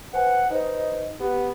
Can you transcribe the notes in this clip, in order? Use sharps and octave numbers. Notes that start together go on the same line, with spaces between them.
B4 C5 F#5 G#5
D#4 B4 C5 D#5
B3 G4